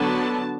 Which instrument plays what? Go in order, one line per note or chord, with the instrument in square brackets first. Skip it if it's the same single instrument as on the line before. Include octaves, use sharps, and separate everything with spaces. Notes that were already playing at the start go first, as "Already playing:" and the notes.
Already playing: [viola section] D3 F#3 B3 D4 A5